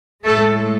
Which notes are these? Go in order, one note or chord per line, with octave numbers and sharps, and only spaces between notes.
A2 G#3 A3 A4